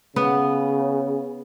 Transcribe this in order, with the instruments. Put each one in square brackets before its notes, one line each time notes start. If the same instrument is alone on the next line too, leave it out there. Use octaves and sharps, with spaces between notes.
[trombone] C#3 [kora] B3